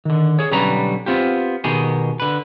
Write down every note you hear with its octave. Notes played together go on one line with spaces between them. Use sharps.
D3 D#3
G#4 C#5
B1 D3 G3 C#4 B4 A#5
B3 C4 F4 G4
B2 D#3 G4 G#4
D3 B4